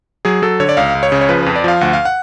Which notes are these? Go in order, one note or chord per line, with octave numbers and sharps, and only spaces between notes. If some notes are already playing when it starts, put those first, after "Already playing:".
F#3 G#4
F#3 A4
D3 C#5
D5
C#2 F5
C#2
C#5
C#3
C#5
F3 B4
F2 B4
D5
F3 F5
D2 F#5
F5
F#5